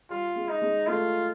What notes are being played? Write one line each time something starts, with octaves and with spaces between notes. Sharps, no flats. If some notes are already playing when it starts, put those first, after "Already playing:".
G3 F4
G#3
D#4
G#3
A3 F4